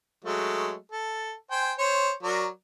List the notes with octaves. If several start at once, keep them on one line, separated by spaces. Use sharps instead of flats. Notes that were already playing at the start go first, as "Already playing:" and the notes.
F#3 G#3 A3
A4
C5 G5 G#5
C5 C#5
F#3 A#4 D5